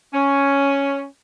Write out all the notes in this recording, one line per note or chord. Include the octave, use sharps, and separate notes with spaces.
C#4